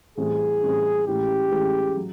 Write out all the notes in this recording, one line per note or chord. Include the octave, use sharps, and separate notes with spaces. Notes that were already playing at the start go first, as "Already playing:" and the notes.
A2 E3 G3 C4 G#4
A2 E3 G3 C4
A2 E3 G#3 C#4 G4
A2 E3 G#3 C#4
F#3